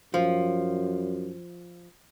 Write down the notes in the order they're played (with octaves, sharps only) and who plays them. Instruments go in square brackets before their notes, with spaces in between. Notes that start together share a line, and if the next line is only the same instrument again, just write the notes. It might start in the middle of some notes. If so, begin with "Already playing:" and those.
[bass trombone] F#2 [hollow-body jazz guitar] F3